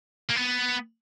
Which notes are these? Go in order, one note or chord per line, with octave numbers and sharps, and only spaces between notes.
A#3
B3